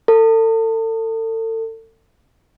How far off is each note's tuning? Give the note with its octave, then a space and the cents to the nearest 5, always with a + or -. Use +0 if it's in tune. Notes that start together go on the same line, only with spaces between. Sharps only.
A4 +35